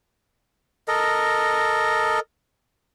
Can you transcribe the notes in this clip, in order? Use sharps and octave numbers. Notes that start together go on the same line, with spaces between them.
A4 A#4 D#5